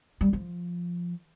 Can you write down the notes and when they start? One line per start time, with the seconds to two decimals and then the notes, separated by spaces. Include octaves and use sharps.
0.21 G3
0.33 F3